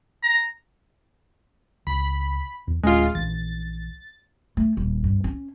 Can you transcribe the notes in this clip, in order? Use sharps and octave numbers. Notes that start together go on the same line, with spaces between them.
A#5
C#2 B5
E2
D1 G#3 A#3 C#4 F4
A#1 E3 A6
A3
D#1
G2
C#4